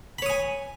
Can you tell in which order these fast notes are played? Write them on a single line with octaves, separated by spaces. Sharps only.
B5 C#5 D#6 G#5